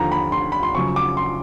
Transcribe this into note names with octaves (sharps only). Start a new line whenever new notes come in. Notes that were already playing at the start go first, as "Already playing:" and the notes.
Already playing: D#2 D3 F3 A#5
B5
C6
B5
C6
F#2 C#3 F3 C#6
D6
C6